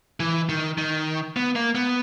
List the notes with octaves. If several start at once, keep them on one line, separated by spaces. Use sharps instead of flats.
E3
D#3
D#3
B3
A#3
B3